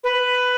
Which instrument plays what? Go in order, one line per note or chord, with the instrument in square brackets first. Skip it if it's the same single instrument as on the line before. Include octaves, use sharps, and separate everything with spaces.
[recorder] B4